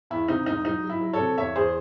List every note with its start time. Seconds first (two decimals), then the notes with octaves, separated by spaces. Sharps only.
0.10 E2 E4
0.28 C3 D#4
0.46 E1 D#4
0.65 F#3 D#4
0.83 F#3
0.90 E4
1.01 F#3
1.13 A4 C#5
1.19 C3
1.37 E2 C#5 E5
1.55 E2 G#4 C5